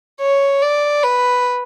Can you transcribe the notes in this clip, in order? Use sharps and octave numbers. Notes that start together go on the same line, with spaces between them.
C#5
D5
B4